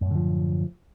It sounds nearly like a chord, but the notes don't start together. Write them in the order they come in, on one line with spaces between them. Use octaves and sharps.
F#2 A2 D3 F3